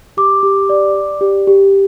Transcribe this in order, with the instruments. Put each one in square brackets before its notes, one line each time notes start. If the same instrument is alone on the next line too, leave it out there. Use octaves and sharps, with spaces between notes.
[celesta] G4 D6
G4
D5
D5
G4
G4